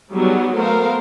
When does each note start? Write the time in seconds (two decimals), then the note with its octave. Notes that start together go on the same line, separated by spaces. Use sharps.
0.14 F#3 G3 B3 D#4 F#4 G#4
0.57 A3 B3 A#4 C5 F5